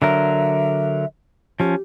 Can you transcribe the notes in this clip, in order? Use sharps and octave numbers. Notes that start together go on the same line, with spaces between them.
D3 F#3 A#4 E5
F3 C#4 G4